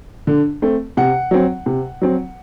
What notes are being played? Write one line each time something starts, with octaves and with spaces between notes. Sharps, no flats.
D3
A3 C4
C3 F#5
F#3 C4
C3
F#3 C4